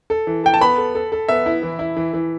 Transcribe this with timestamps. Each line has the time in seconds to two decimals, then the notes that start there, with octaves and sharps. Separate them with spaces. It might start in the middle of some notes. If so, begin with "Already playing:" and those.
0.10 A4
0.27 E3
0.44 A4 G5
0.54 A5
0.61 B3 B5
0.78 A4
0.95 A4
1.12 A4
1.28 B3 E5
1.46 E4
1.63 E3
1.79 E4
1.97 E3
2.13 E3